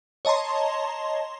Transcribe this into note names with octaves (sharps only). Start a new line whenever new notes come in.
C#5 D#5 A5 A#5 C6